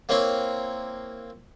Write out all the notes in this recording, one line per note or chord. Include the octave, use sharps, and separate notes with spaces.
A#3 C4 E4 C#5